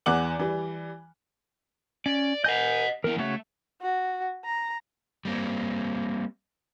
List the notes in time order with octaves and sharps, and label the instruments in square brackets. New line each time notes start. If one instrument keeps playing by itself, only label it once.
[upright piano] E2 E3 F#5 D6 F#7
E3 G3
[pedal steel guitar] C#4 [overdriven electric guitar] D5
[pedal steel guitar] A#4 G#5 G6 [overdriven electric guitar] D#5 F#5
[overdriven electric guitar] E3 B3 [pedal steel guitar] A#4
[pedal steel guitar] C#3 F#4 C#5 [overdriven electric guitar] A3
[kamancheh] F#4
A#5
[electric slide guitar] G3 A#3 C4